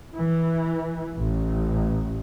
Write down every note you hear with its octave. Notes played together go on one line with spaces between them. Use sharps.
E3
A1